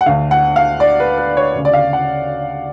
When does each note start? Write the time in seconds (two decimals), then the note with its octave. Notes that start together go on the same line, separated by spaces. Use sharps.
0.01 F#5
0.06 D2 D3 F5
0.31 F#5
0.56 F5
0.80 D5
1.00 B4
1.18 B4
1.37 C#5
1.55 D2 C#3
1.65 D5
1.73 F5
1.93 F#5